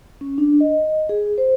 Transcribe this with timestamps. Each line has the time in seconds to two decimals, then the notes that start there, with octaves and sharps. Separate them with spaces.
0.21 C#4
0.38 D4
0.61 D#5
1.09 G#4
1.38 C5